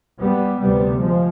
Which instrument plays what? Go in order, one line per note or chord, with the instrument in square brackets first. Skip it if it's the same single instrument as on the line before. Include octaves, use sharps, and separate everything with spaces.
[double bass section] G3 B3
D2 C3 G3 B3
F3 G#3